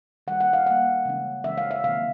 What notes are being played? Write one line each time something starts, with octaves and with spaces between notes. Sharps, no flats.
D#3 G3 A#3 F#5
F#5
F5
D#3 G3 A#3 F#5
C#3 E3 G#3 C#4
C#3 E3 G#3 C#4 E5
F5
E5
C3 D#3 F#3 A#3 F5